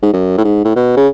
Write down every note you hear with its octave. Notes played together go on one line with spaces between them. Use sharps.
G#2
F#2
A2
G#2
A2
B2
C#3